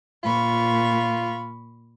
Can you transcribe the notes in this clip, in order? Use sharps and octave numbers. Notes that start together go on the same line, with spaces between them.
A#2 F4 B5 C#6